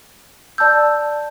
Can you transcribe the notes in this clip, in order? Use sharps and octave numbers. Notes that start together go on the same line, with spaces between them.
D5 A5 E6 G6